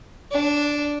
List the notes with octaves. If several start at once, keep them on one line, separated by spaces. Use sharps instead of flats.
D4